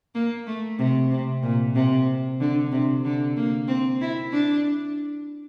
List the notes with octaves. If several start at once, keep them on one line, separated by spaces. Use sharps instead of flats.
A#3
A3
C3
C3
A#2
C3
D3
C3
D3
A#3
C4
E4
D4